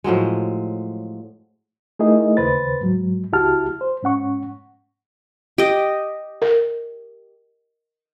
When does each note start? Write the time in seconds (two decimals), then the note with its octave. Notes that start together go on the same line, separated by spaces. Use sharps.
0.04 A2 F3 F#3 G#3
1.99 A3 D#4 E4 G#4 A#4 D#5
2.37 D#2 C#3 B4 C5 A6
2.81 G#2 F#3
3.33 C#2 E4 F#4 G4 A5 F6
3.81 C5
4.03 G#2 C#4 F#5 C#6
5.58 G4 D#5
6.42 A#4